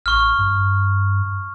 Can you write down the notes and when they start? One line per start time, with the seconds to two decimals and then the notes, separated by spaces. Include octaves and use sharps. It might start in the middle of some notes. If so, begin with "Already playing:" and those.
0.06 A1 C#6 F6
0.38 G2